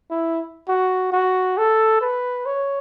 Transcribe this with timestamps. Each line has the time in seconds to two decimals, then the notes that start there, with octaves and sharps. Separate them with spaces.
0.10 E4
0.69 F#4
1.12 F#4
1.58 A4
2.01 B4
2.46 C#5